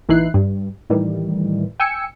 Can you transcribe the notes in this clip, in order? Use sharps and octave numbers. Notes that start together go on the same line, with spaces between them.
A#1 E3 D#4 E4 F#6 C7
G2
A2 D#3 E3 G3
G5 G#5 E6 C#7